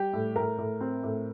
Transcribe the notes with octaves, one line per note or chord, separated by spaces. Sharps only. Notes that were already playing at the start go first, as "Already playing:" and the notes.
Already playing: G3 G4
A2
A2 A#4
A2
C4
A2